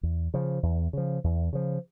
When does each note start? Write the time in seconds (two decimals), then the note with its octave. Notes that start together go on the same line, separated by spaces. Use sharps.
0.03 E2
0.34 C#3 F3
0.63 E2
0.93 C#3 F3
1.24 E2
1.53 C#3 F3